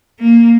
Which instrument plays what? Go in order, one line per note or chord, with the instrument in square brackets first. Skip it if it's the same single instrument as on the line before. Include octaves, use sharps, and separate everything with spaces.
[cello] A#3